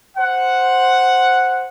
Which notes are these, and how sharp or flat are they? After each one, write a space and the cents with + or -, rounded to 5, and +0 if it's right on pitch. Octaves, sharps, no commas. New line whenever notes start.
C5 +0 F#5 +0